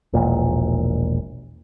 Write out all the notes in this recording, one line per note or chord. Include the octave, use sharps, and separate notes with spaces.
E1 A#1 A#2